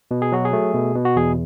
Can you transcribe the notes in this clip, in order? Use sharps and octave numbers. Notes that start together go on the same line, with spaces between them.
B2
G#4
F#3 F#4
G#4
A3
B2
B2
F#4
E2 G#4